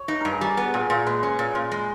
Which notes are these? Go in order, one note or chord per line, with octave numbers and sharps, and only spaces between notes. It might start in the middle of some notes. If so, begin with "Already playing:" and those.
Already playing: C#5
D#4 B4
G2 A#4
G#4
G3 A#4
B3
A#2 G#4
A#2
G#3 B4
C#4
A#2
A#2
G#3